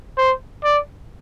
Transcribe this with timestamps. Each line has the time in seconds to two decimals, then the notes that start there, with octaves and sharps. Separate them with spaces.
0.18 C5
0.64 D5